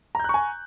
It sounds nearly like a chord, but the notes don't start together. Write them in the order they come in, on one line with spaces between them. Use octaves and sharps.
A#5 G6 F#6 C#6 G#5